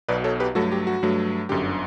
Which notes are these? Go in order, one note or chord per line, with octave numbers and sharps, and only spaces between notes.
B1 B2 F#3 B4 D5
A4 C#5
G4 B4
G2 F#3 A3 F#4 A4
G4
F#4
G2 F#3 A3
G1 F#2 D3 G4